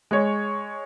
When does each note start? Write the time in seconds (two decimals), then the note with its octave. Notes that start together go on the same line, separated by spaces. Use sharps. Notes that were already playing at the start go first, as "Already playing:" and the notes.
0.11 G#3 C#5